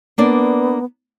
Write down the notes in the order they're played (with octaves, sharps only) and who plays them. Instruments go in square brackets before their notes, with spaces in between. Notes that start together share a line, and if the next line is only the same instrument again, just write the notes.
[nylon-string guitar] A#3 D4 D5 [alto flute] B3